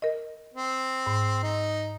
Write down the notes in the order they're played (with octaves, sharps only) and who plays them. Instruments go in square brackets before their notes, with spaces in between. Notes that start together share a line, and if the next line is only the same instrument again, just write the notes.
[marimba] A#4 D#5
[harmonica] C4
[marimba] G#2
[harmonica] D#4